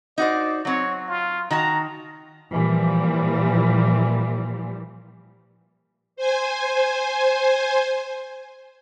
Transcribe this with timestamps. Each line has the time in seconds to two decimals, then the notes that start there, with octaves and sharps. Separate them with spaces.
0.18 D#4 F#4 C5 D5
0.65 F#3 C4 C#5
1.08 F4
1.51 D#3 F#4 A5 A#5
2.52 A#2 E3 F3 G3
6.16 C5 G#5